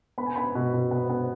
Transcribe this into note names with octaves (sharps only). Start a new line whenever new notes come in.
B3 B5
G#5
B3 B5
B2
B2
B3
B3